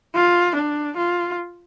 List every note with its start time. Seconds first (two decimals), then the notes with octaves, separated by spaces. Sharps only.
0.15 F4
0.56 D4
0.97 F4